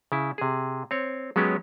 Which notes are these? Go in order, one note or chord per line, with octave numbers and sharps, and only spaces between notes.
C#3 E4
C3 G#4
C4 C#5
F#3 G#3 B3 C#4 G4